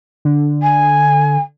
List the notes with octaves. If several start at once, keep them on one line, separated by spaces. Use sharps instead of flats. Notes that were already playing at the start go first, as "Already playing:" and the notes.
D3
G#5